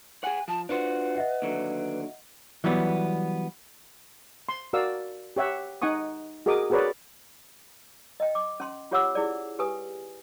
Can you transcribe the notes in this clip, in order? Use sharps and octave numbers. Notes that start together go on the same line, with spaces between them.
G#4 F#5 G#5
F3 A5
D4 F4 F#4 B4 C5 C6
D#5 E5 F#5
D#2 D3 F#3
E3 F#3 G3 B3
C6
F#4 A#4 D5 F5 E6
G4 C#5 E5 F#5
D#4 F#5 G#5 C#6 D#6
F#4 G#4 A#4 D#5 D6 D#6
F#4 G#4 A#4 B4 C#5 D5
D#5 G5
D6
C#4 C6
F4 G4 C#5 F#5 D6 E6
E4 G#4 D5
G4 B4 G#5 D#6